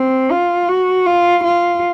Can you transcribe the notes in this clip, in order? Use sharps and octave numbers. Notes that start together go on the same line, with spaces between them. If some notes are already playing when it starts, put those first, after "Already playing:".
Already playing: C4
F4
F#4
F4
F4